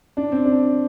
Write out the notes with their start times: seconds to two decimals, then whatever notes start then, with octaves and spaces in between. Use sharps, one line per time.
0.17 D4
0.32 C4
0.45 D4